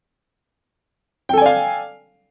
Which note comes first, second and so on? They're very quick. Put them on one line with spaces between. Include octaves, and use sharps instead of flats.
G5 A4 G#5 D5 F5